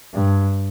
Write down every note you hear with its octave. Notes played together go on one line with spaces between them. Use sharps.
G2